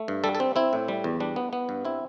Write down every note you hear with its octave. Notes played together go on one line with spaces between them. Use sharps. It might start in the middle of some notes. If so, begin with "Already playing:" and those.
Already playing: A3
G2
G3 A4
A4
C4
C4 E4
A2
G3
E2
G3 D4
B3
B3
G2
C4 E4